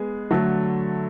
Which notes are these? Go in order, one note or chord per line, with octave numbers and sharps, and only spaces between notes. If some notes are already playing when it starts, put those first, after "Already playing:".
Already playing: G#3 B3 G#4
D3 F#3 A3